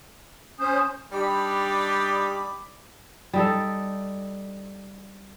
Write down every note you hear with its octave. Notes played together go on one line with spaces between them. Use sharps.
C#4 C5 D#6
G3 D4 D#4 G4 D5 B5
G3 D#4 A4